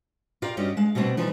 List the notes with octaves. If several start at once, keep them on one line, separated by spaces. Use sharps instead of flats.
F4 G4 A#4 D5 F5
G2 G3 C#4 F#4 D#5
G#3 F5
B2 G3 A3 C4 D4
E3 F3 G3 D#4